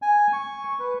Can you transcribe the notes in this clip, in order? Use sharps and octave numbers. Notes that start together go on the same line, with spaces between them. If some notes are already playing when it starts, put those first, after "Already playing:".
G#5
C#6
B4